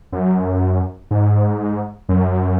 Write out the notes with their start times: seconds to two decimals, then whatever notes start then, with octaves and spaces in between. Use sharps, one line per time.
0.12 F#2
1.11 G#2
2.09 F#2